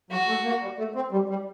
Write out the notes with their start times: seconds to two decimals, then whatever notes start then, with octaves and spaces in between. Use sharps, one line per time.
0.11 F#3 F#4
0.28 A3
0.44 A#3
0.61 G3
0.78 A3
0.95 C4
1.12 G3
1.29 G3